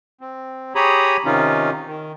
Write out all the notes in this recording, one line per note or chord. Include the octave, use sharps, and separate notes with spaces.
C4
G4 G#4 C#5 A#5 B5 D#6
C3 D#3 C#4 D#4 F4
D#3